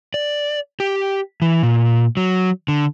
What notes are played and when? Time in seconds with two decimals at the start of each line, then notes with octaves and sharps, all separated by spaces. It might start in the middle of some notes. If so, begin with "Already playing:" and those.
0.14 D5
0.80 G4
1.42 E3
1.63 A#2
2.17 F#3
2.68 D3